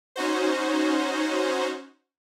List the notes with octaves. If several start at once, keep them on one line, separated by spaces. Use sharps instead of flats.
C#4 D#4 F#4 C5